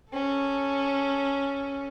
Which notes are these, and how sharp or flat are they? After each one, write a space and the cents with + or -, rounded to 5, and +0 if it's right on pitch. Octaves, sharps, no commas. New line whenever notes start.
C#4 +0 A4 +0